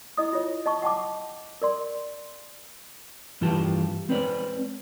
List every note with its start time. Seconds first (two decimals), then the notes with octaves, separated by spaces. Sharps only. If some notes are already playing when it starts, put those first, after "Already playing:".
0.17 E4 D#5 D#6
0.33 F4 C#5
0.66 D#5 A5 C#6
0.82 F#5 G5 A5 D6
1.62 A#4 D5 C6
3.41 G2 E3 F4 G4 A5
4.09 G#3 C4 B4 C#5 D5